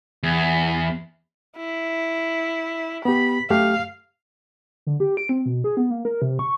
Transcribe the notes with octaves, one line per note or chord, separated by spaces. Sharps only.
E2
E4
B3 G4 B5
F#2 A3 G4 F5
D3
G4
D7
C4
B2
G#4
B3
A#3
A#4
C3
C#6